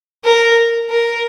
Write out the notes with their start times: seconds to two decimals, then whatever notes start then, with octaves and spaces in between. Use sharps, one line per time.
0.24 A#4
0.89 A#4